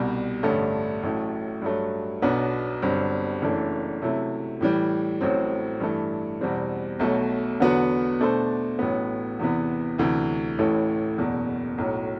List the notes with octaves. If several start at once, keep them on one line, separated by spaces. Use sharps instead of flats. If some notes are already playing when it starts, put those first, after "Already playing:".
Already playing: C2 B2 G3
A1 G2 D3 A3
A1 A2 F#3 A3
G2 F#3 A3
B1 B2 F#3 B3 D4
G1 G2 F#3 C4
F#1 F#2 E3 A3 D4
C3 F#3 A3 E4
A2 E3 G3
A1 A2 F#3 C4
G2 E3 A3
E2 B2 G3 C4
B1 B2 F#3 A3
E2 D3 F#3 B3 F#4
B2 A3 D4 A4 C5
A1 A2 F#3 B3
E2 C3 E3 B3
D2 C3 E3
A1 A2 E3 A3
F#1 E2 B2
B1 A2 F#3